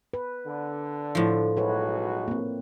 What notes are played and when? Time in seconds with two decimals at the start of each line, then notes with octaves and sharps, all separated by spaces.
0.14 B4
0.47 D3
1.15 A2 F3
1.57 B1 G#3 E4 F#4 B4 C#5
2.28 A#3 C4